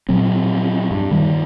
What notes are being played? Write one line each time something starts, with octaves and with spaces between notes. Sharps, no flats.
A#2 F3 F#3 C4
G2
D#3 G3